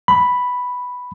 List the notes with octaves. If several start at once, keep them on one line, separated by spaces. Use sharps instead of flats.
B5